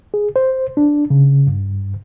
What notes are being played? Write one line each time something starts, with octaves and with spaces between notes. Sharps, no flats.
G#4
C5
D4
C#3
G2